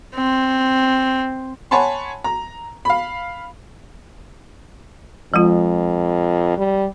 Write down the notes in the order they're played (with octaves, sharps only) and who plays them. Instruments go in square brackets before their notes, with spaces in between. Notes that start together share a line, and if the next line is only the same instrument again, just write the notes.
[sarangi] C4
[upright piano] C#5 F#5 G#5 A5 B5 C6
A#5
F5 B5
[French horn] F2 [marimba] F3 G#3 F4
[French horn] G3